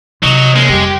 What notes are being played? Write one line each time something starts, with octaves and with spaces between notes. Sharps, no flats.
C3 F3 F#3 D#4
G#3 A#3 C#4
F2 G3 G4